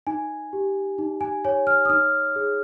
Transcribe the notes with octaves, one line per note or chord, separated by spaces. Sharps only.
D#4 G#5
G4
D#4
G#5
C#5 G#5
F6
D#6
D#4 F6
G#4